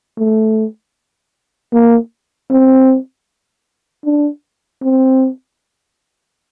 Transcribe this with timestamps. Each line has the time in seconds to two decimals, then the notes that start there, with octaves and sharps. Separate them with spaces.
0.18 A3
1.73 A#3
2.50 C4
4.05 D4
4.82 C4